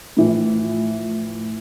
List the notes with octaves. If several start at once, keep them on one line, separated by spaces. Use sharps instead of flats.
A2 E3 F3